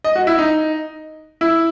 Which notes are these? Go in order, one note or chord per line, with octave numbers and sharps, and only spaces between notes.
D#5
F#4
E4
D#4
E4